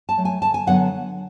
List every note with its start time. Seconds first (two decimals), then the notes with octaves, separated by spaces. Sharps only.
0.09 A5
0.18 F#3 A3
0.25 G#5
0.41 D2 A5
0.54 G#5
0.67 D3 F#3 B3 F#5